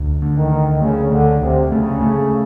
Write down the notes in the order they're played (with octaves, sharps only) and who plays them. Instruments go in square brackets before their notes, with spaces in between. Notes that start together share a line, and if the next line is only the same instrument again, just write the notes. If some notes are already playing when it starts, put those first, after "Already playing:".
Already playing: [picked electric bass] D2
D3
[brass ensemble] D#3
[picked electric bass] D2
[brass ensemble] C#3 [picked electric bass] A3
[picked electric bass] D2 [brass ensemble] D3
[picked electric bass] D2 [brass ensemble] C3
[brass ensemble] C#3 [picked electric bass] A3
[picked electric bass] A3